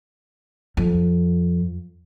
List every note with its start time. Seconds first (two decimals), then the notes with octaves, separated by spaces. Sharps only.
0.77 F2